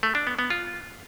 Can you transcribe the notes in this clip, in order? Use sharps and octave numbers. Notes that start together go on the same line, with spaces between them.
A3
D4
B3
B3
F4